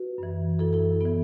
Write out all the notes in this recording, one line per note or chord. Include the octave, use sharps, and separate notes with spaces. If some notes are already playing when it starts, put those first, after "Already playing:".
Already playing: F#4 B4
F#2 E3
F#2 E3 E4 A4
E4 A4
E3 B3 E4